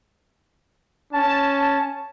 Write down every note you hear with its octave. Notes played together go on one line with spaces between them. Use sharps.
C#4 A5